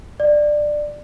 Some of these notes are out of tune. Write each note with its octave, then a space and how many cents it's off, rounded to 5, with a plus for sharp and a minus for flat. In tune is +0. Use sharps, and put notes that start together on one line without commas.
D5 +15